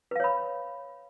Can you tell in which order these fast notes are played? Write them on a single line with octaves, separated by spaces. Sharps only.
B4 F5 C#5 B5